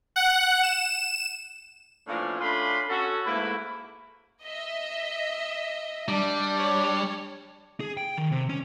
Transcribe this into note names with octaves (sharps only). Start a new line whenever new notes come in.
F#5
E7
A2 E3 F3 A#3 C#4 D4
A3 C#4 D4 F4 B5 C6
C#4 F#4 A4
G#2 A3 A#3 E4 B4 B5
D#5 E5
G3 D4
C#5
G#4
G5
D#3
C3
C#4